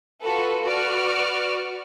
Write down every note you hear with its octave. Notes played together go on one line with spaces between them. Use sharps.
F4 F#4 A4 B4
F#4 B4 D5 F6